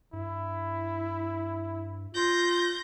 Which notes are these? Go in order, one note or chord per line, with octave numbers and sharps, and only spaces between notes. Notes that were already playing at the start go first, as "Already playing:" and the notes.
G2 E4
F4 G6 A#6